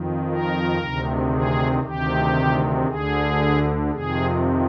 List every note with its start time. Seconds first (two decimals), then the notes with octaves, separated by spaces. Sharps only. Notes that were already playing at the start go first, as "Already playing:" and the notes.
Already playing: F2 D#3
0.29 A#4
0.79 D2 C3 D#3
1.31 G#4
1.83 D2 C3 D#3 G4
2.86 D2 D3 G#4
3.90 F2 C3 D#3 G#4